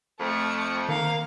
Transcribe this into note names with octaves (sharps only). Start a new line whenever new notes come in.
F2 A3 C#7
D#3 A#3 F5